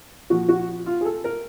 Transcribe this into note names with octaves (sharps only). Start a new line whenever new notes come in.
A#2 F3 F#4
F#4
F4
G#4
A4
A#4